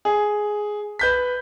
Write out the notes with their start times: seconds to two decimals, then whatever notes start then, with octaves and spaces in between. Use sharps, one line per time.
0.05 G#4
0.99 B4 G6 B6